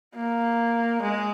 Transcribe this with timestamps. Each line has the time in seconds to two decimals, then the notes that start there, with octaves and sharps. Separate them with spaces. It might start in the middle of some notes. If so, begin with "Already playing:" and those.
0.16 A#3
1.02 G#3